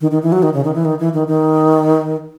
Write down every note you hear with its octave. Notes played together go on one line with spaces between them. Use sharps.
D#3
D#3
E3
F#3
D#3
C#3
D#3
E3
D#3
E3
D#3
D#3